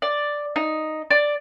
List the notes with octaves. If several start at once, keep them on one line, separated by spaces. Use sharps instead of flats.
D5
D#4
D5